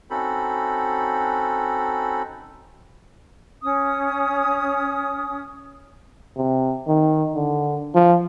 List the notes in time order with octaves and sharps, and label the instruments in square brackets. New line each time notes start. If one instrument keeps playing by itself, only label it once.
[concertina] C4 C#4 D#4 F#4 A4 B5
[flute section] C#4 D#6
[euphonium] C3
D#3
D3
F3